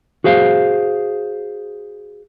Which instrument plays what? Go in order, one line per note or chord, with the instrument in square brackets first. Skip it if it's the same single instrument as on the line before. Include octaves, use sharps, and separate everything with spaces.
[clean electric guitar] F#4 G#4 C5 F5